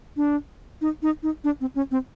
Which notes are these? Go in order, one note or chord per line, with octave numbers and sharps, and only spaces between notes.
D4
D#4
D#4
D#4
D4
C4
C#4
C4